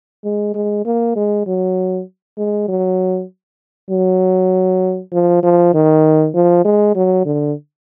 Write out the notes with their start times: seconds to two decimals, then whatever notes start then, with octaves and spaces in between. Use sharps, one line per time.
0.24 G#3
0.55 G#3
0.85 A#3
1.16 G#3
1.47 F#3
2.38 G#3
2.68 F#3
3.90 F#3
5.12 F3
5.43 F3
5.74 D#3
6.34 F3
6.65 G#3
6.95 F#3
7.26 D3